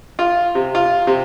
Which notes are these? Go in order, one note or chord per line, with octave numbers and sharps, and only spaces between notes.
F4
C3
F4
C3